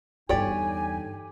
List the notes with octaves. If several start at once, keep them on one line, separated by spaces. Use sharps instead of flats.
E2 G2 D3 D#4 G4 C#5 D5 G#5